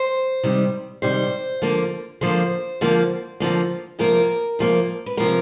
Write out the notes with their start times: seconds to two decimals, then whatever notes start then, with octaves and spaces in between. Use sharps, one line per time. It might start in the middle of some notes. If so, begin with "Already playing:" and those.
Already playing: C5
0.43 C3 D#3 G3
1.02 C3 D#3 G3 C5
1.62 D3 F3 A#3
2.21 D3 F3 A#3 C5
2.81 D3 F3 A#3
3.40 D3 F3 A#3
3.99 C3 F3 A#3 A#4
4.59 C3 F3 A#3
5.06 B4
5.17 C3 F3 A#3 A#4